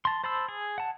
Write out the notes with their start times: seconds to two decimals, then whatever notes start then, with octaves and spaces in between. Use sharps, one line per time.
0.05 A5 C6
0.24 C5 A5 B5 C6 E6
0.49 G#4
0.78 F#5 A5